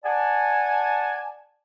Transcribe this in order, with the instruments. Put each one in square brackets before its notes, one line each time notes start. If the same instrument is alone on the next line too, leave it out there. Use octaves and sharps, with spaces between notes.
[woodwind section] D5 F#5 G#5 A5